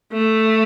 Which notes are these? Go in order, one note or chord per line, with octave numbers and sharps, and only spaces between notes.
A3